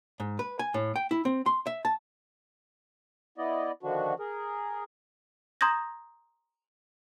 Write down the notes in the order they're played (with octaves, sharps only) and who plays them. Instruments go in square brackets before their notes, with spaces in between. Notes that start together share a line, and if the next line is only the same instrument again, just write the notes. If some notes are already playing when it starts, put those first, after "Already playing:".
[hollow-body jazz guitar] G#2
B4
G#5
A2
G5
E4
C4
C6
E5
A5
[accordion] B3 E4 D5 D#5
D3 D#3 F3 D4 F#4
G#4 A#4
[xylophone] A#5 C6 D#6 G6 G#6 A#6